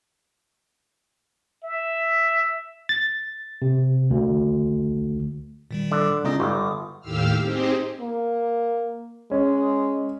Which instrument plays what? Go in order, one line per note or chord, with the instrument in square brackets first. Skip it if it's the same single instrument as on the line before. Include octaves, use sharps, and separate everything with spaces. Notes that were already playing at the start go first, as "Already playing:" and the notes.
[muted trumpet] E5
[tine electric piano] A6
C3
D2
[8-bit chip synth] A#2 D#3 G3
[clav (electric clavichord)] D3
[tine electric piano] C#3 D#4 D#5 [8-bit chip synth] G#3 B3 F4
[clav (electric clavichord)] G1 [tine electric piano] G3 [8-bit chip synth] D6 D#6
[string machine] D#2 A2 G4 F5 E6 F6
C4 D#4 G4 G#4 C5
[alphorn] A#3
[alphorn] G#3 [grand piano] C#4